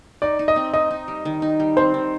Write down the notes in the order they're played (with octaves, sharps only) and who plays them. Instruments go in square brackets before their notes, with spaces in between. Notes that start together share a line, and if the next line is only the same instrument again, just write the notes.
[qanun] D#4 [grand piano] D5
[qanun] D#4
[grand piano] D#5
[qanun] C4
[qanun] D#4 [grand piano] D#5
[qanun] D#4
G3
D#3
D#4
G3
[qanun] C4 [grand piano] C5
[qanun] D#3